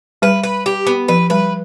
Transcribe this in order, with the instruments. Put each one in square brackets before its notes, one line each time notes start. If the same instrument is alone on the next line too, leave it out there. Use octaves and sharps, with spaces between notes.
[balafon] G3 [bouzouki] B4
[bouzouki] B4
G4
B3
[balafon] F3 [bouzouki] B4
[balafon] G3 [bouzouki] B4